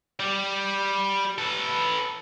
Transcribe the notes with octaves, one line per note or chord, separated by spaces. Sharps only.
G3
A4 B4